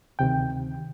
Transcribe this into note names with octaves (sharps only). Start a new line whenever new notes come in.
D2 C3 D#3 G5